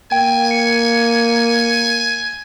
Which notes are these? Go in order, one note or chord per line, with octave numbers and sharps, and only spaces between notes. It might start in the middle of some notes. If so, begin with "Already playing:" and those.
A#3 G5 G#5
C#7